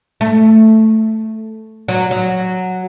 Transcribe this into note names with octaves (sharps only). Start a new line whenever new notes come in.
A3
F#3
F#3